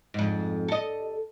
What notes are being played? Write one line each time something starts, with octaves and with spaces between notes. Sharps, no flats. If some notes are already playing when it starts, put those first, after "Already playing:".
F2 G#2
A4 D#5